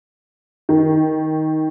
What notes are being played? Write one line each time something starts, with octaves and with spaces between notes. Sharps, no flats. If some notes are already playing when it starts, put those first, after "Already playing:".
D#3